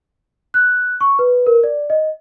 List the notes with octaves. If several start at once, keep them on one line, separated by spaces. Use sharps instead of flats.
F#6
C#6
B4
A#4
D5
D#5